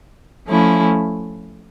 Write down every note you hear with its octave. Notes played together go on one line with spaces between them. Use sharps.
F3 A3 C#4 E4